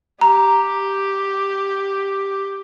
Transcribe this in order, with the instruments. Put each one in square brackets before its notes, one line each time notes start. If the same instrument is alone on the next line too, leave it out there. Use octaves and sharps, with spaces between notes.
[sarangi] G4 [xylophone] A#5